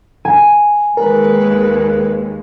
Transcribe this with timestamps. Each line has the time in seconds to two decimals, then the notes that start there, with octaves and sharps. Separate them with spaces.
0.25 G#5
0.97 D#2 G#3 A#4 B4